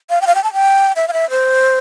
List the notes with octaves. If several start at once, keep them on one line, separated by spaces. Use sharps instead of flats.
F5
G5
F5
G5
A5
G5
E5
F5
E5
C5